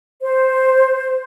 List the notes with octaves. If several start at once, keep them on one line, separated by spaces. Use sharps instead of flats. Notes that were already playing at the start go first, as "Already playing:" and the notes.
C5